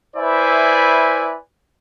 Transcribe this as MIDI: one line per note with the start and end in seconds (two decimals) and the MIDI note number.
0.16 1.35 64
0.16 1.35 71
0.16 1.35 72
0.16 1.35 74
0.16 1.35 76
0.16 1.35 80